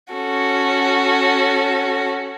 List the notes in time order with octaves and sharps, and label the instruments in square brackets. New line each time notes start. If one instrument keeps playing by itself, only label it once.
[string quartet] C#4 F#4 A4